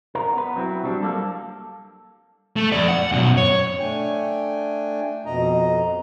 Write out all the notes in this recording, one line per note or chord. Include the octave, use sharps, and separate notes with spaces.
A#4
B3 B4
F#3 C4 E4
F#3 G3 D4
G3 A#3 A4
A3
F2 D5
F#5
F#2 B2
C#5
A3 D4 G5 G#5
F2 B2 D#5 A#5